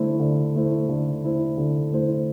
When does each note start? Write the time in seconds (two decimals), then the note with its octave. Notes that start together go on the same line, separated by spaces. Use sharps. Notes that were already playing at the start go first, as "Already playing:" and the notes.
Already playing: D3 A3 E4 C5
0.20 D3
0.55 A3 E4 C5
0.89 D3
1.23 A3 E4 C5
1.58 D3
1.92 A3 E4 C5